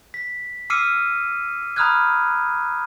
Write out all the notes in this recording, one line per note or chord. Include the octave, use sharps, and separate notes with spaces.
B6
D6 E6 F6 C7 C#7 D#7
A#5 B5 D#6 F6 F#6 G#6